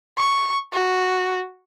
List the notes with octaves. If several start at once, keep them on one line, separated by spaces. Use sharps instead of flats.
C#6
F#4